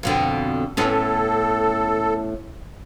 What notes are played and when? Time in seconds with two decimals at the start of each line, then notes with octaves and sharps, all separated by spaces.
0.03 F2 B2 D3
0.77 A2 B3 C#4 A4